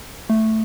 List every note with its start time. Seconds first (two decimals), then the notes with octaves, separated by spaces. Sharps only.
0.30 A3